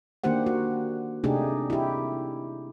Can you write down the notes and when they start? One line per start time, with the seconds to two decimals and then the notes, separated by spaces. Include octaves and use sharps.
0.24 D#3 A#3 D4 G4 C5 F#5
0.46 F#4
1.24 C3 A3 D4 D#4 G4 G#4
1.70 E4 G4